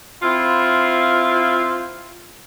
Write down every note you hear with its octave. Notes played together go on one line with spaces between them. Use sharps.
C4 E4 F4